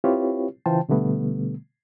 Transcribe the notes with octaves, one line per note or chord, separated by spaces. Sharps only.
C4 E4 F4 G4 B4 C#5
C#3 E3 F4 C5 G5 A5
B2 D3 G3 A3 B3